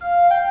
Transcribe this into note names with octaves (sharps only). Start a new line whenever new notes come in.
F5
G5